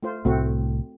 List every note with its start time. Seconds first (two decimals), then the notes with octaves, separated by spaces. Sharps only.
0.03 A3 F4 C5
0.25 C2 A2 A3 C4 F#4